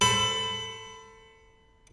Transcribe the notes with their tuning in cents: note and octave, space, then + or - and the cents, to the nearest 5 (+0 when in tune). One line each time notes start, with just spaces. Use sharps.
A4 +20 C5 +0 B5 +25